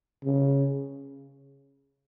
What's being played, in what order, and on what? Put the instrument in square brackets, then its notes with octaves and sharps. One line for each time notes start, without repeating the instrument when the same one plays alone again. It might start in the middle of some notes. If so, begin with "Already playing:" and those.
[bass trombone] C#3